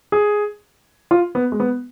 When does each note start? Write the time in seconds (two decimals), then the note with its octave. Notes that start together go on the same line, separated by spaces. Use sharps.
0.12 G#4
1.11 F4
1.35 B3
1.52 G#3
1.60 B3